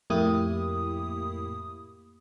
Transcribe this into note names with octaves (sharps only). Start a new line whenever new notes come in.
F2 A2 A#3 E4 G4 D#6